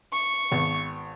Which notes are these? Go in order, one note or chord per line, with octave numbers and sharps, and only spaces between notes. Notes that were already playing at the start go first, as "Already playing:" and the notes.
C#6
G#1 B3